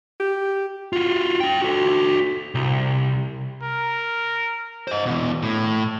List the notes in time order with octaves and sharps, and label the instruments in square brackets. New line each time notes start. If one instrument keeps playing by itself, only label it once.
[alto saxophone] G4
[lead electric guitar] F4 F#4
D4 G5
F#4 A4
C2
[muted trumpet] A#4
[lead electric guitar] C5 D#5
B2 E3
A2